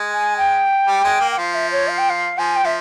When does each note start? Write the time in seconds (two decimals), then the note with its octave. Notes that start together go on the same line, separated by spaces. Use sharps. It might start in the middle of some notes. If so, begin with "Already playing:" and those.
Already playing: G#3
0.12 G#5
0.37 G5
0.87 G3
1.04 G#3
1.21 A#3
1.31 G5
1.38 F3 F5
1.54 E5
1.71 C#5
1.88 F5
1.98 G5
2.10 F5
2.38 F3 G#5
2.56 G5
2.64 F3 E5